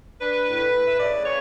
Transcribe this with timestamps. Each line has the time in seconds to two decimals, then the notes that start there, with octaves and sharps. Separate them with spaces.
0.20 D4 B4
0.47 A2
0.72 A2
0.85 E5
0.98 C#3 D5
1.24 C#3 C#5